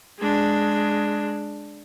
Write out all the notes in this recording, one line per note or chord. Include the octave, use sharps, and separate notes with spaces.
G#3 D4